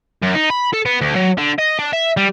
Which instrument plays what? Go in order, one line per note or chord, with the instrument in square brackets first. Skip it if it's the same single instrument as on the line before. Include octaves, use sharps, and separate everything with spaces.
[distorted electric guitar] F#2
D#4
B5
A4
B3
D2
F#3
D3
D#5
D4
E5
G3